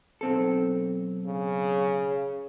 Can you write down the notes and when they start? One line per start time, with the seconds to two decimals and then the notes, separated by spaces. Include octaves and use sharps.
0.21 B1 C4 A4
1.26 C#3